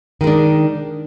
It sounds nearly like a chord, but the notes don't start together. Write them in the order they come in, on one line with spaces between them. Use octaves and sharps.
D#3 G#3 D4